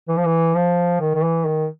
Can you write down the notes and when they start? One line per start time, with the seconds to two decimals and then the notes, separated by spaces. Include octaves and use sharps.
0.09 E3
0.17 F3
0.26 E3
0.55 F3
1.01 D#3
1.15 D#3
1.23 E3
1.45 D#3